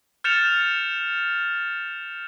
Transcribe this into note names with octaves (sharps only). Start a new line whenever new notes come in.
F6 G6 A6 C#7 E7 F7